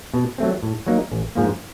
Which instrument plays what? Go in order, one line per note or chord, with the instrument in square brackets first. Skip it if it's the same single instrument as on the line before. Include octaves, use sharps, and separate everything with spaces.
[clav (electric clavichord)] B2
F#3 A3 C4
A2
F#3 A#3 D#4
A1
G#2 F3 A#3